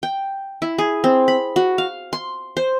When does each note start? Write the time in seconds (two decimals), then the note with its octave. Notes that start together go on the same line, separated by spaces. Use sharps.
0.03 G5
0.62 E4
0.78 G#4
1.04 C4
1.28 B5
1.56 F#4
1.78 F5
2.13 C6
2.57 C5